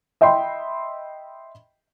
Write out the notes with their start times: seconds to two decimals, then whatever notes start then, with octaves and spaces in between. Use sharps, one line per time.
0.21 D#5 E5 G5 B5 C6